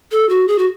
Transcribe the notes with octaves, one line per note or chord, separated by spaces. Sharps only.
A4
F#4
G#4
F#4